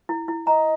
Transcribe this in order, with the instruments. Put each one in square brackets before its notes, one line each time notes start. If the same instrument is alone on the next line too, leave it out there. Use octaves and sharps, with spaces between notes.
[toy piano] E4
E4
[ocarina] D#5 [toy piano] A#5